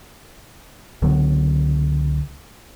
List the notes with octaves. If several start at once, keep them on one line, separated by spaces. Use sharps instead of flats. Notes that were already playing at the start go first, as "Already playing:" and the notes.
C#2 D3 F#3 B3